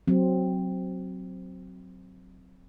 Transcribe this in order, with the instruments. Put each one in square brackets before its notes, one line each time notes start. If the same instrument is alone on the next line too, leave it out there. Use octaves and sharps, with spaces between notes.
[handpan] F#3 C4